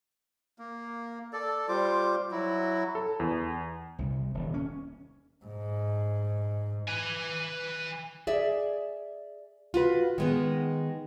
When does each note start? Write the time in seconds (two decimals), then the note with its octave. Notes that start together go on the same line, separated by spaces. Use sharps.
0.59 A#3
1.33 A4 D5
1.69 G3 F4 C5 D6
2.31 F#3 E4 F#4
2.95 A4
3.20 E2
3.98 C2
4.34 D#1
4.54 C#4
5.45 G#2
6.88 B4 G#5
8.27 G#4 D5 E5
9.74 F4 F#4 B4
10.18 D#3 G#3 B3